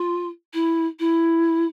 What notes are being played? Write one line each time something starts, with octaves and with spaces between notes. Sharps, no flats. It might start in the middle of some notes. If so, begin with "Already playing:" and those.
Already playing: F4
E4
E4